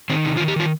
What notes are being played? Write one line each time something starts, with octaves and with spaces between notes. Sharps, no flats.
D#3 C4
C3 D#4
F4
D#3
G4
D#3 F4